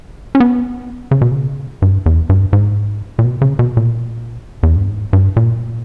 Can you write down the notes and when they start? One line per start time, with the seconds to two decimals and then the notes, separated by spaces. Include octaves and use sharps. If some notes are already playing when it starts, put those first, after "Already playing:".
0.35 C#4
0.40 B3
1.11 C#3
1.21 B2
1.31 C#3
1.82 G2
2.06 E2
2.29 G2
2.53 G#2
3.19 A#2
3.24 B2
3.41 C#3
3.59 B2
3.77 A#2
4.63 E2
4.76 G2
4.89 G#2
5.13 G2
5.36 A#2